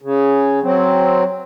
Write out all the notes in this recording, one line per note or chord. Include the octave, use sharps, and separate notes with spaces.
C#3
F#3 C4